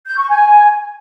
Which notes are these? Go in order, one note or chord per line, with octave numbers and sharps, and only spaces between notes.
G6
C#6
G#5